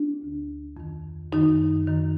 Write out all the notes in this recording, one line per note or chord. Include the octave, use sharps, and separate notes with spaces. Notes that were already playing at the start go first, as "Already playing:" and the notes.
Already playing: D4
D2 D3
F2 D#3
F#2 D#3 D#4
F#2 D#3